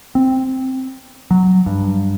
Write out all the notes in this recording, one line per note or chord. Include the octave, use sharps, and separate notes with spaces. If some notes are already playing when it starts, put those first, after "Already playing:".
C4
F#3
G2